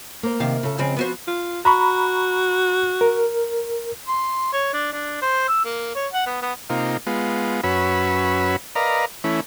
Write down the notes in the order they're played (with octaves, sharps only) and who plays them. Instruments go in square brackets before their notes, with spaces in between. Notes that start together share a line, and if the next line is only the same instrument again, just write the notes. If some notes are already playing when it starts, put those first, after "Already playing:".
[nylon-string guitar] A#3 A#4 C5
[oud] C3 D#3 F5
[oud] C#3 [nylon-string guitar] F4 A4
[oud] C#3 G#3 C4 [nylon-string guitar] F3
[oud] B3 F#4 C5
[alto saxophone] F4
[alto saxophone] F#4 [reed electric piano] A#5 B5 C#6
[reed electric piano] A#4
[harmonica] C6
C#5
D4
D4
C5
E6
A#3
C#5
F#5
B3
B3
[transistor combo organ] C3 A#3 D#4 F4
G#3 B3 F4
F#2 C#4 F#4 B4 B5 E6
A#4 B4 D5 D#5 F5 A#5
E3 A3 C#4 E4